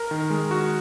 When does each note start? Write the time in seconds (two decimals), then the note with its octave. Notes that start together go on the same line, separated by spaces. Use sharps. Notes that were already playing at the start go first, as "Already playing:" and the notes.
Already playing: A#4
0.11 D#3
0.30 G#3
0.51 F#4